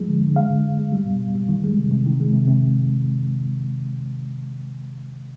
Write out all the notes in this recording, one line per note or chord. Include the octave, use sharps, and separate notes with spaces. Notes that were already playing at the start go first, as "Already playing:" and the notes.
Already playing: F3 G#3
D3
D3
G#3 F5
D3
D3
G#3
G3
B2
B2
G3
D#3
G#3
C3
C3
D#3
G#3
C3
C3